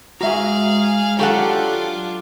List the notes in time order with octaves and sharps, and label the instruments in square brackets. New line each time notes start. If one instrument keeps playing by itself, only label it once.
[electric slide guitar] G#3 A#5 [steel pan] F#4 E5 [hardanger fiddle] G#4 F5
[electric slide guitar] F#3 [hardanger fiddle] D4 F4 [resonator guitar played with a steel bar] G4 A4 F#5 [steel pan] A#5 C#6